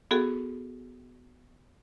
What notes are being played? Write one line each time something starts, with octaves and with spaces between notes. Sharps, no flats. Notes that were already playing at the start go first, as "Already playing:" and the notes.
B3 F#4 G#4 A4